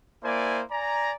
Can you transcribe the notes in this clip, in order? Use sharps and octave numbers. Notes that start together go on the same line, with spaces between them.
A#3 E4 C5 D5 G#5
D5 G#5 A#5